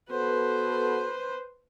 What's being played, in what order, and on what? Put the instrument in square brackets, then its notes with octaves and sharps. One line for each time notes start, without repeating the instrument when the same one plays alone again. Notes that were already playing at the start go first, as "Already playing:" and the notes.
[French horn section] B3 F#4 A4 [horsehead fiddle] B4 C5